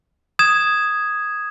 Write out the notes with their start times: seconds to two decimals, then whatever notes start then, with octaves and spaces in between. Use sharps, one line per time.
0.39 D#6 G#6 E7